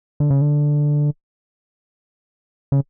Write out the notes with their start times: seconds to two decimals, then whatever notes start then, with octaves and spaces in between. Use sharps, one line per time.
0.20 D3
0.30 C#3
0.41 D3
2.72 C#3